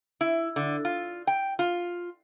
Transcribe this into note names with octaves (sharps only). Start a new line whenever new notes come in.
E4
D3
F4
G5
F4